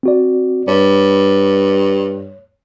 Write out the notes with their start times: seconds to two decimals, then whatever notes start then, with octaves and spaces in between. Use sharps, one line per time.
0.03 C4 F#4 D5
0.68 G2 C#5